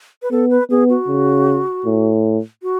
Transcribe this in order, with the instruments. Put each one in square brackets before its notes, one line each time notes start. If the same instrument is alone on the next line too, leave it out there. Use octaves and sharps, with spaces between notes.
[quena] B4
[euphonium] B3 [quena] A4
[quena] B4
[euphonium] B3 [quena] G#4
[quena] F#4
[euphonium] C#3
A2
[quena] F#4